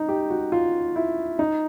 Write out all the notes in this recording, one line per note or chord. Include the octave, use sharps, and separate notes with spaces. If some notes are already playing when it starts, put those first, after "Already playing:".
Already playing: D#4
G4
F#4
F4
E4
D#4